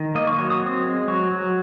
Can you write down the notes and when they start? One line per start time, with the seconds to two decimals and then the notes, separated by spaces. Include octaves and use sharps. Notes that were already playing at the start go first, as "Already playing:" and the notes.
Already playing: D#3
0.15 A#3 D#5
0.27 C#6
0.39 F#3 C#6
0.50 D#6
0.62 C4
0.85 G#3
1.08 F#3 C#6
1.32 F#3